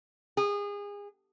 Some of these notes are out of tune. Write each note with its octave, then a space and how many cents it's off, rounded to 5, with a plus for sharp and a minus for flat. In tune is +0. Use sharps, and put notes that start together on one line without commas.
G#4 -30